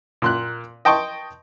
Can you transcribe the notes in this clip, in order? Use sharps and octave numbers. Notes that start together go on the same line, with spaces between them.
A#2 C6 F#6
D#5 G5 A5 C6 C#6